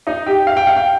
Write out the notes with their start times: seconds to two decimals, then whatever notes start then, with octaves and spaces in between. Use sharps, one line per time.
0.07 D#4 D#5
0.26 G4 G5
0.47 F5
0.57 G5
0.67 F5
0.76 G5